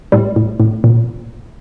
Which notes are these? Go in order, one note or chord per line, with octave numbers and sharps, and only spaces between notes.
A2 G3
A2
A2
A#2